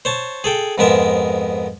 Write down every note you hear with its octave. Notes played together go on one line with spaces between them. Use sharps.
C5 C#5 A5
G#4 A4 G5
F2 G#2 G#3 B3 A#4 E5